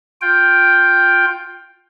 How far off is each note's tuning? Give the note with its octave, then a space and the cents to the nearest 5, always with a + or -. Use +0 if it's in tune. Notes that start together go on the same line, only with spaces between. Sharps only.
F4 +15 G5 +0